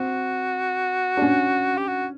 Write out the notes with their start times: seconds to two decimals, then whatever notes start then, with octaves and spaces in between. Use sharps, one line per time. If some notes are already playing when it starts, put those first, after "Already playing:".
Already playing: C4 F#4
1.17 D4
1.22 C#4
1.77 G4
1.88 F#4